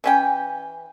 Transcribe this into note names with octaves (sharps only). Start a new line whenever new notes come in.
E3 C#4 G5